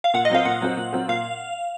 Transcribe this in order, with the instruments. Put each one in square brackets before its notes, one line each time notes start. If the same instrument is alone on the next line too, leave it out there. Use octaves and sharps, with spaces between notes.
[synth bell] F5
[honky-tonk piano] A#2 [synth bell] F#5
[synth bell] D#5
[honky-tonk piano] F#3 C4 F4 C5 [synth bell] F5
[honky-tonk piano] A#2 [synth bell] F#5
[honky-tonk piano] F#3 C4 F4 C5
A#2
F#3 C4 F4 C5
[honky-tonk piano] A#2 [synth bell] F5